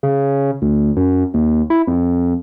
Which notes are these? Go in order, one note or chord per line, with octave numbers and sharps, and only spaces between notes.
C#3
D2
F#2
D#2
E4
F2